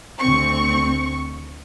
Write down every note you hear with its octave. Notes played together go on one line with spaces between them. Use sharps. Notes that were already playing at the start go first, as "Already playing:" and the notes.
D2 C4 C#6